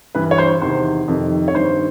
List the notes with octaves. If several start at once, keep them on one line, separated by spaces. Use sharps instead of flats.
G2 E3 B4
C#5
C5
E2 C3 D#3 C5
F2 C3 D#3
C#5
G2 D#3 C5